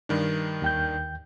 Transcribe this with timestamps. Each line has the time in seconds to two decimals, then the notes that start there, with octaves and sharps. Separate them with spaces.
0.09 G2 D#3 D4
0.62 D#2 G5 G6